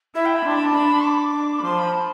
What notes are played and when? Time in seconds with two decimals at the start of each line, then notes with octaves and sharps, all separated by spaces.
0.15 E4 E5
0.25 G5
0.35 B5
0.45 D4 C6
0.55 B5
0.64 A5
0.74 D4 B5
1.04 D6
1.33 D4
1.59 B5
1.63 F3 C6
1.78 B5
1.93 A5